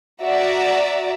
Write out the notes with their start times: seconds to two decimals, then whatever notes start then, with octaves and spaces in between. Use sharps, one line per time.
0.20 F#4 D5 E5 A#5